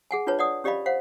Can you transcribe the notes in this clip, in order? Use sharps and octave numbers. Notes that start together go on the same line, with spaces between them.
G#4 F#5 G#5
D4 F4 B4 C#5 A5
D5 F#5 D#6
C#4 G4 D5 D#5 F5 B5
C5 F5 F#5